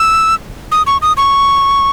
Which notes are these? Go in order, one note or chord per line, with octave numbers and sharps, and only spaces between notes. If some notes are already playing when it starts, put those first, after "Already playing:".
Already playing: E6
D#6
C#6
D#6
C#6